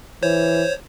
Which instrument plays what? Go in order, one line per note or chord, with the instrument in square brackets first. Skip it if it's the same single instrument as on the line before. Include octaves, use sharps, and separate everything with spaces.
[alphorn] E3 [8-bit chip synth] C5 C#5